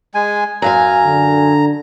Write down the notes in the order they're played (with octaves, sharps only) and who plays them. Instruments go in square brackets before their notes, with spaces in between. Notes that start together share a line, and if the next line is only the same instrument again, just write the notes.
[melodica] G#3 G#5
[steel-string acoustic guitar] F#2 F5 G#5 [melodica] A#5
[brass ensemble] D3